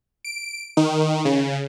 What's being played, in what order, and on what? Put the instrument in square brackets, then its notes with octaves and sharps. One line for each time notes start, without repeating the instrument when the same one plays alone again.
[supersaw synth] D7
D#3
C#3